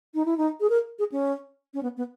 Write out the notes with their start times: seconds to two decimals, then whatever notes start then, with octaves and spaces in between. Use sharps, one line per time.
0.14 D#4
0.25 E4
0.38 D#4
0.60 G#4
0.70 A#4
0.99 G#4
1.12 C#4
1.74 C#4
1.83 B3
1.97 B3